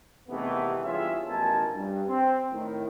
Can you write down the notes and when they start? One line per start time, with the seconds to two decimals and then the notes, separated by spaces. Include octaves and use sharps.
0.29 C3 D#3 E3 G#3 A3 B3
0.84 E2 G2 F4 G#4 C#5 E5
1.27 A1 B2 F3 A#4 G#5 A5
1.74 G2
2.07 C4
2.52 A2 D#3